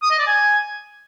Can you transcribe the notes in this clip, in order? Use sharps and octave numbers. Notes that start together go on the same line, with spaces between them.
D#6
D#5
D5
G#5